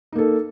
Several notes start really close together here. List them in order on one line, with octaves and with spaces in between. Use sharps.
D#4 A#3 A4